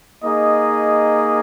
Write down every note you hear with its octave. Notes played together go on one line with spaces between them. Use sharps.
A#3 D#4 G#4 D#5